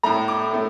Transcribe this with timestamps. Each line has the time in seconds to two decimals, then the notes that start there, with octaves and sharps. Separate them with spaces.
0.03 A2 A3 A#5
0.28 D6
0.53 A2 A3